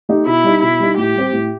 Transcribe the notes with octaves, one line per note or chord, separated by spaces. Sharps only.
A3 D#4 G4
B2 E4
G3 D#4
B2 E4
G3 D#4
A2 G4
G3 C4
A2